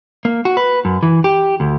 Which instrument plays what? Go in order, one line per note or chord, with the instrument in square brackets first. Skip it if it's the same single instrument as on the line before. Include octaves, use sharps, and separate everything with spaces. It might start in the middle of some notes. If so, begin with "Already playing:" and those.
[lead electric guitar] A#3
F#4
B4
F#2
E3
G4
D2